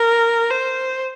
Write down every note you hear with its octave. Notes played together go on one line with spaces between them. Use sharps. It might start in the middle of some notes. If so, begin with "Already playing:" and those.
Already playing: A#4
C5